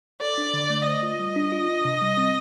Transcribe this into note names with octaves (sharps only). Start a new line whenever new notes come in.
A4 D5
D4
D3
A3
C5 D#5
F4
G3
D4
F4
D4
C3
G3
C4